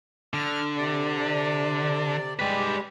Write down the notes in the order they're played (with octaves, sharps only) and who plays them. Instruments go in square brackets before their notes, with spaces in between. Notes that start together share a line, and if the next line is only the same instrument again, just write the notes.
[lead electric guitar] D3 [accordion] F6
[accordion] C3 D5
[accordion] G3 G#3 G4 [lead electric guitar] B4 D5